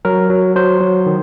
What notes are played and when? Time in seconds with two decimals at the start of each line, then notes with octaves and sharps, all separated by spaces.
0.05 F#3 A#4
0.30 F#3
0.56 F#3 C5
0.81 F#3
1.06 D#3